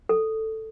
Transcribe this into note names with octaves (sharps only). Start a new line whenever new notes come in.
A4